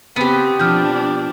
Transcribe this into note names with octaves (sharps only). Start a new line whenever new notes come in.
C#3 B3 C4 G4
B2 F3 C4 D4 F6 G6